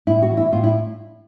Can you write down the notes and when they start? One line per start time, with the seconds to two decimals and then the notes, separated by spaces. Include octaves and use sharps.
0.07 A2 E4
0.22 F#4
0.30 E3
0.37 E4
0.52 A2 F4
0.64 E4